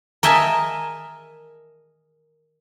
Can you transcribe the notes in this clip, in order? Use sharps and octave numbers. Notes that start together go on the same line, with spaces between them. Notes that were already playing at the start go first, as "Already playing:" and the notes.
A#4 D#5 E5 G#5 A5